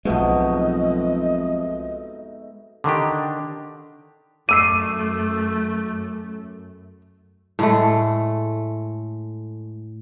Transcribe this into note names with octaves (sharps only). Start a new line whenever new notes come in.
B1 F2 G#2 B2 G#3 A3 D#5
D3 D#3 D4 G4
F#2 A3 D6 E6 C7 D#7
A2 G#3 A3